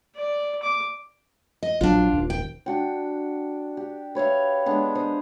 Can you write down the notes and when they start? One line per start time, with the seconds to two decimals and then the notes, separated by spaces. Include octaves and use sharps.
0.17 D5
0.63 D6
1.63 D#5
1.81 A#1 F#3 D4 F4
2.13 D#1 D#2
2.30 G5
2.66 D4 F#4 G5
3.77 G4
4.15 B4 C#5 E5 F5
4.66 G#3 B3 D4
4.95 C5 D#5